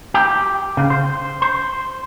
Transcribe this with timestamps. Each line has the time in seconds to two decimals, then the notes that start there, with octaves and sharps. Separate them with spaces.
0.14 G4
0.77 C#3
0.90 C5
1.42 C5